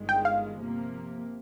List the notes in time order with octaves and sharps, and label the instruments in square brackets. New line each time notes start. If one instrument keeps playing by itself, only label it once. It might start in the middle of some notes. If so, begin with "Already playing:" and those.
Already playing: [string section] G1 G2 D#3 G#3
[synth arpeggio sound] G5
F5
[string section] C3 F3 A#3